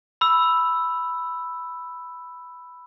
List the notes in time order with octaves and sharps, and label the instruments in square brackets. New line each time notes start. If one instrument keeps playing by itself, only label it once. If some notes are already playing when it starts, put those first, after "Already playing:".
[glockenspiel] B5 E6